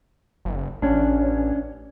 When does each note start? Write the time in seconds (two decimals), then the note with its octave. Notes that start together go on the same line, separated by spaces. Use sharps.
0.45 F#1
0.82 A1 C#4 D4